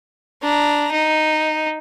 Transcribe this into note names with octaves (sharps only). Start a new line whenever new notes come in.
D4 A#5
D#4